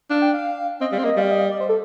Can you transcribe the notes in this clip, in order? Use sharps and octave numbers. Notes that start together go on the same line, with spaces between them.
D4 F5
G5
F5
C4 D#5
G3 F5
C4
A#3 D#5
G3 F5
D#5
D5
C5
A4